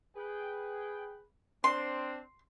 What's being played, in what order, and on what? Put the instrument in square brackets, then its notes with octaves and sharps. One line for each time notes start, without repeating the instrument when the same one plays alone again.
[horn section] G#4 B4 G5
[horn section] C4 D4 [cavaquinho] C6